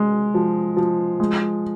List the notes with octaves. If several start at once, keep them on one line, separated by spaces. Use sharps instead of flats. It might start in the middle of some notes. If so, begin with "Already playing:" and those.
Already playing: G#3
F3
F3
G#3